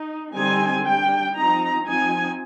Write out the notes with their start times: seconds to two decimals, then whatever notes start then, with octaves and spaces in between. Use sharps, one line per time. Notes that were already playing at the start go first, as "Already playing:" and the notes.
Already playing: D#4
0.35 D3 G3 C4 D#4 G#5
0.85 G3 D4 G5
1.35 F3 C4 D#4 A#5
1.86 F3 C4 D#4 G#5